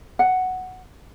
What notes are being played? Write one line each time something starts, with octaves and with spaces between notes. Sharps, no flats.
F#5